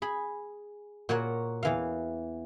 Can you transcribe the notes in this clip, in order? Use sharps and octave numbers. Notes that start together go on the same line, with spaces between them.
G#4 B5
A#2 F#4 A#4 C#5 F#5
E2 E3 F5